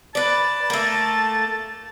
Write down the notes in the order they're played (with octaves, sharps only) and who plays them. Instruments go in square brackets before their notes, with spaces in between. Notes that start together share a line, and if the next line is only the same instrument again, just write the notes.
[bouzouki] B4 D5 [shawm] A5
[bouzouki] A3 A#3